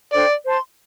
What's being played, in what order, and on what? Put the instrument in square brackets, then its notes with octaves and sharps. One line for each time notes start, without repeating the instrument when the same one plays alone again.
[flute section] D4 A4 C5 G5 [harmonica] D5
[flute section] C5 A5 C6